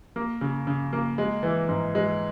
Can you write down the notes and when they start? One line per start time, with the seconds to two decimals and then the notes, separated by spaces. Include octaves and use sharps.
0.16 A#3
0.41 C#3
0.67 C#3
0.93 A#3
1.18 G#3
1.43 E3
1.69 G#2
1.95 G#3